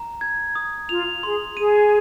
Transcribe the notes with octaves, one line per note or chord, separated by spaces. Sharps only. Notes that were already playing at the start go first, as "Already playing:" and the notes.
Already playing: A#5
G#6
D#6
F4 F7
G#4 C6
G#4 D#7